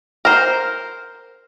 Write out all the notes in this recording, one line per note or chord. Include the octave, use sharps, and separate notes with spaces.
A#4 C5